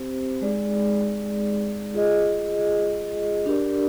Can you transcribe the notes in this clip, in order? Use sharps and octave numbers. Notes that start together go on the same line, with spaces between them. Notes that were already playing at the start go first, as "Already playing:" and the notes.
Already playing: C4 G4 C5
G#3 D#4 G#4 D5
F4 G#4 D#5
D4 G4 A#4 D5